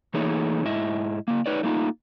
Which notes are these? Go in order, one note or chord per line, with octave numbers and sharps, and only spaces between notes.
E3 A3 A#3 D#4 G#4 C#5
G#2 E4 D#5 E5
C#3 A#3
D#4 B4 C#5 D5
A3 A#3 D#4 F4